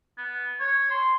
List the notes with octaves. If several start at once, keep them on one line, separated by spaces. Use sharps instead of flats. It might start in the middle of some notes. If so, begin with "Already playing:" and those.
B3
C#5
C6